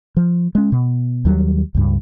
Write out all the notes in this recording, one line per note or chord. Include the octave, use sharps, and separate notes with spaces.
F3
G#3 C#4
B2
D#2 F#3 G3
C#2 G2